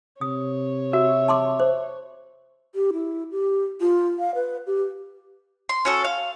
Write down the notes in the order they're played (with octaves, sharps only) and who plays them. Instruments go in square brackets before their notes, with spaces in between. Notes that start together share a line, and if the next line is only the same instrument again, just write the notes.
[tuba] C3 [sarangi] C#5 [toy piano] D#6
[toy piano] F#4 [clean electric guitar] E5
[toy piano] A5 C6 D6
C5
[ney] G4
E4
G4
F4
F5
B4
G4
[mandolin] C6
C#4 F#4 A4
F5